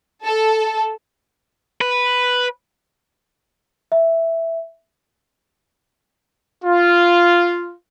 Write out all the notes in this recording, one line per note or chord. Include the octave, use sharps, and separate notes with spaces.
A4
B4
E5
F4